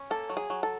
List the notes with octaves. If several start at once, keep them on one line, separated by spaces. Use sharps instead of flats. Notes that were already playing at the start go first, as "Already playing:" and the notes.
Already playing: C#4
A#3 A4
F#3
G#4
F#3
A4